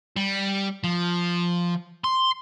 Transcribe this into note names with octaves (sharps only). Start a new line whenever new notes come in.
G3
F3
C6